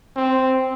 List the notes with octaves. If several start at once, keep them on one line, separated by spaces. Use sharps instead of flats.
C4